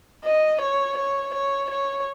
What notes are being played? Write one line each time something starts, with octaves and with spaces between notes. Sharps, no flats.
D#5
C#5
C#5
C#5
C#5